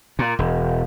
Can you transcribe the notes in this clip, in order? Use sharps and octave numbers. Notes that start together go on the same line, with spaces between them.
A#2
E1